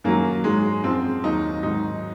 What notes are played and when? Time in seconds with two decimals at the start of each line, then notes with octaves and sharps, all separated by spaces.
0.04 F#2 D#3 F#3 A#3
0.44 G#2 F#3 G#3
0.83 F#2 F3 C4
1.24 D#2 D#3 F#3 D#4
1.63 G#2 D#3 F#3 D#4